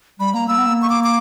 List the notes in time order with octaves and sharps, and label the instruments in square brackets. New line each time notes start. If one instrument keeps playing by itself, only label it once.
[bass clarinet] G3 [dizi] B5
[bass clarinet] A#3 [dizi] A#5
[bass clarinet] A#3 [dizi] E6
[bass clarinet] B3
A#3
[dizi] C#6
D6
D6